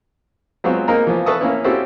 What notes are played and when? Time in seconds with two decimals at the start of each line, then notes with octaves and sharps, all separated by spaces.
0.64 F#3 G#3 B3 C4 F4 F#4
0.88 A#3 C4 D#4 G#4 A#4
1.07 E3 F3
1.26 A4 B4 E5 A5 C#6 D#6
1.41 A#3 C#4 E4
1.64 C4 C#4 E4 F#4 G4 A4